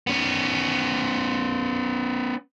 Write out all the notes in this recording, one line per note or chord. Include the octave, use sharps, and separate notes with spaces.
B3 C#4